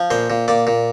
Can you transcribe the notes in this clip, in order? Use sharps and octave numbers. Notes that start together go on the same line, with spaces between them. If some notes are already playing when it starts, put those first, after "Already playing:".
Already playing: F3
A#2 C5
A#2
A#2 D5
A#2